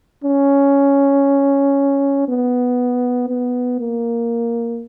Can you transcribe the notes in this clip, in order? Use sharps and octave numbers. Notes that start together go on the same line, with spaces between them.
C#4
B3
B3
A#3